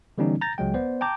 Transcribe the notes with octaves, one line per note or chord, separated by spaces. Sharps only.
D3 E3 G3 B3 C#4 D#4
A#5 G6 A6 A#6
C#2 F#3 G#3 G5
B3 C5 D5
G5 A5 A#5 D6 G6